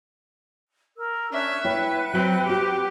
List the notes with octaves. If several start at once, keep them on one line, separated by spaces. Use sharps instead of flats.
A#4 E6
C#4 D4 E5 F#6
E4 B4 C#5 F#5 G5 F#6
F#3 C4
C4 F#4 G4